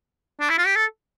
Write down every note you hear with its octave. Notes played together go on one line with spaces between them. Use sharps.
D4
E4
F4
G4
A4